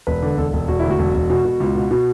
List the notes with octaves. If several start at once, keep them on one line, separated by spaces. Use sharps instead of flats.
E1 B4
D3
E1 A4
E1
E1 F#4
D2 E4
F#4
E1
E1
B2
B2
C#2
B2
B2